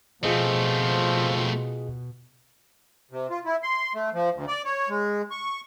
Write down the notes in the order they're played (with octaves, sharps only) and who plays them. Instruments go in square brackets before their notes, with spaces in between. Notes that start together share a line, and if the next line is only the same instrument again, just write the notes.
[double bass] B2 [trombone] F3 [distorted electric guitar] A3 C4 [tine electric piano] F4 G#4 D#5
[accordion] C3
F4
E4
C6
A3
F3
D2
D5
C#5
G#3
C#6